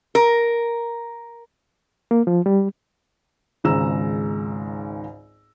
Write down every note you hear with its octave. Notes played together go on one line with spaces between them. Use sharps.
A#4
A#3
F3
G3
G#1 C#2 G#2 A#5 E6 E7